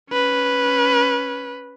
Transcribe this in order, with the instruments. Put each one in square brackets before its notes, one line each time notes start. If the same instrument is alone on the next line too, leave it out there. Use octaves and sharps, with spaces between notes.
[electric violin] C#4 B4